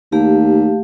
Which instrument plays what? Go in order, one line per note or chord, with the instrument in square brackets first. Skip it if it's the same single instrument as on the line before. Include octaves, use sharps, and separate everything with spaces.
[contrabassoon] D#2 [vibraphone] A3 G4 F5